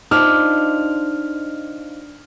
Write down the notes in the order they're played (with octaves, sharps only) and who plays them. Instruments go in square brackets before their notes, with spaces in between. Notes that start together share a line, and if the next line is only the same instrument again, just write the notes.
[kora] D4 [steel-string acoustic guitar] D#4 F4 C5 [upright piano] F6